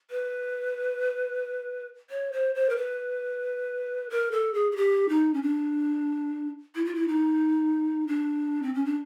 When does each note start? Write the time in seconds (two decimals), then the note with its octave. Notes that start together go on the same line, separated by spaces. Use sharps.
0.11 B4
2.10 C#5
2.32 C5
2.55 C5
2.69 A#4
2.76 B4
4.10 A#4
4.31 A4
4.54 G#4
4.72 G#4
4.76 G4
5.09 D#4
5.34 C#4
5.42 D4
6.75 E4
6.85 F4
6.95 E4
7.08 D#4
8.07 D4
8.63 C4
8.74 C#4
8.85 D4